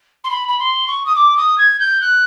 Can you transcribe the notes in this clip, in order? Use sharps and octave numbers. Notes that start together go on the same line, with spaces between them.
C6
B5
B5
C6
C#6
D#6
D6
D#6
G#6
G6
F#6